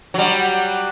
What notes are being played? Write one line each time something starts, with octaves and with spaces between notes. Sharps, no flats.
F#3 G3